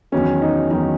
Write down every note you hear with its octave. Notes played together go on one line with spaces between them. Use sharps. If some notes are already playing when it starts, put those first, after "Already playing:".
E2 D#3 F#3 C#4
D#4
E2 D#3 F#3 D#4